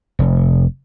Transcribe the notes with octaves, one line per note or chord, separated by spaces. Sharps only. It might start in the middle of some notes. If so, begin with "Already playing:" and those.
F1